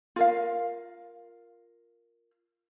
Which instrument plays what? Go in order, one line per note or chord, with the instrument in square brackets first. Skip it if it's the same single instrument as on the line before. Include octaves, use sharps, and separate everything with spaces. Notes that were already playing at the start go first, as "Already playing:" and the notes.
[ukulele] F4 A#4 F5